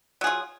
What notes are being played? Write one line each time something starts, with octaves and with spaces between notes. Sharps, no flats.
F#3 F4 G#4